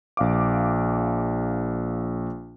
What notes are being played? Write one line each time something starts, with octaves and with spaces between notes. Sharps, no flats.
A#1 F5 D6